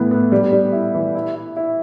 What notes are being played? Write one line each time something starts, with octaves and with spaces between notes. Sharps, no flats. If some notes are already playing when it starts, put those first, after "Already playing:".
Already playing: A2 E3 B3
B3
G3
G3
E4
E3
E4
E4
E4